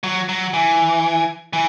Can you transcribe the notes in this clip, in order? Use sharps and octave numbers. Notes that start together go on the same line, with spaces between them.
F#3
F#3
E3
E3